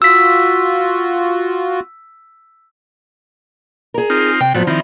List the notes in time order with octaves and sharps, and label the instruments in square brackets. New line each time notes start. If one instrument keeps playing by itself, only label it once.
[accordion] F4 F#4 [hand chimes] E6 B6
[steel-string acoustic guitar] G#4 A#4
[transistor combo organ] C4 D#4 F4
[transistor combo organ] C3 [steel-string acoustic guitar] G5
[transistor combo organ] A2 B3 [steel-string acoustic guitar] F3 F#3
[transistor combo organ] D#3 F3 C4 [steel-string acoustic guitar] E4